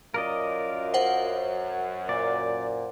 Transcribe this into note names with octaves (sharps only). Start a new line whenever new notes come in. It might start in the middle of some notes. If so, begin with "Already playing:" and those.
F#2 F4 A#4 D5 D#5
C5 F#5
A#2 D5